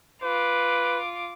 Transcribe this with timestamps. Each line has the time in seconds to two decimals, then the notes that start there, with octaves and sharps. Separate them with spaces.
0.23 F4 B4 D6